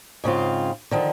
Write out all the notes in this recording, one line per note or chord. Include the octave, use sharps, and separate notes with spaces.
G#2 C#3 C4 F4
D3 D#3 F3